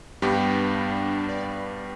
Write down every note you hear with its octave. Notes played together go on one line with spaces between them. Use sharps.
G2 G3 B3 D4 G4
D5